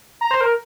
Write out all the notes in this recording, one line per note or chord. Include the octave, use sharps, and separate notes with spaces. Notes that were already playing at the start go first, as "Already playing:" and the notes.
A#5
C5
A#4